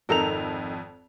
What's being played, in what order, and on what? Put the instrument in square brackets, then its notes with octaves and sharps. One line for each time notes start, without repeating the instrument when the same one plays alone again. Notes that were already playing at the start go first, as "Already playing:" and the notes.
[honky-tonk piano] G#1 F2 F7 [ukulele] D#4 A4 A#4